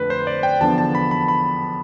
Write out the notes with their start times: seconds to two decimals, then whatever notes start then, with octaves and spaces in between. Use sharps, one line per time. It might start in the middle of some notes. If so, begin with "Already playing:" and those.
Already playing: F2 D3 A3 C4 B4
0.10 C5
0.27 D5
0.43 G5
0.61 E2 D3 F3 B3 D4 A5
0.78 A5
0.95 B5
1.11 B5
1.28 B5